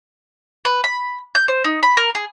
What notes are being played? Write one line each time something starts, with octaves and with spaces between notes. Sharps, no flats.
B4
B5
G6
C5
D#4
B5
A#4
G#4